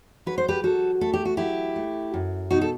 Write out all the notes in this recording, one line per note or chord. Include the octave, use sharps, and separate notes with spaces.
F#3 B4
C5
G4 B4
F#3 F#4 A4
A3 A4
G4
F#4
F#3 E4 G4
A3
F#2
B2 D#4 F#4
A4